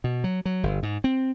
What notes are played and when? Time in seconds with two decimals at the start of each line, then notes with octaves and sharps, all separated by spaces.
0.04 B2
0.24 F#3
0.45 F#3
0.63 G1
0.83 G#2
1.04 C4